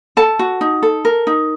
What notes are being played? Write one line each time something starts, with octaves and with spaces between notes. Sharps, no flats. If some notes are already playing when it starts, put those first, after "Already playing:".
A4 A5
F#4
D#4
A4
A#4
D#4